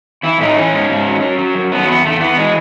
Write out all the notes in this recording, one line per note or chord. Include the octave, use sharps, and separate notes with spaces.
E3 E4
A2 D#4
E3 C#4
G#2
G#2
F#3
F#3
F#3
F#2
F#3 B3
E2 B3
E2 A3
E3 B3
E3 G#3